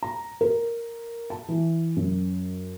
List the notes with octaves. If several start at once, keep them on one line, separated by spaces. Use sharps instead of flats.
A#5
A#4
A5
E3
F#2